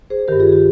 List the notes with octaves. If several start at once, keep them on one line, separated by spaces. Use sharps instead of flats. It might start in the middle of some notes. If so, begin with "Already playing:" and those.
G#4 C5
G2 D#3 G4 A#4
F4 G#4
G4